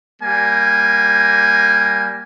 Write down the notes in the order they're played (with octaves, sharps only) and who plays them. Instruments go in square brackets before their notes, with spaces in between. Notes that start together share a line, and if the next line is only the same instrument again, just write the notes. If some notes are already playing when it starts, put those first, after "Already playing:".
[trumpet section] G3 A#3 G#5